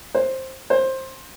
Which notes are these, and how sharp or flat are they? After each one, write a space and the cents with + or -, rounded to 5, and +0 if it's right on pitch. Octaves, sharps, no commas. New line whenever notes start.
C5 +10
C5 +15